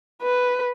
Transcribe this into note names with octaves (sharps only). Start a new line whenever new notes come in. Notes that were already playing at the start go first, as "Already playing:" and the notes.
B4